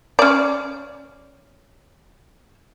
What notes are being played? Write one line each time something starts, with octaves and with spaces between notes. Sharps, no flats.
C#4 D5